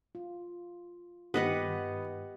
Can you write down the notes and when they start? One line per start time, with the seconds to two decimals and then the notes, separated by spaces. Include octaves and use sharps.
0.15 F4
1.34 G2 D#3 B3 G4 B4 D#5 F#5